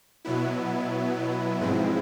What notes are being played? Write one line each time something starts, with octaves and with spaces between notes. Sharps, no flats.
B2 F#3 B3 E4
G#2 F3 G#3 C4 E4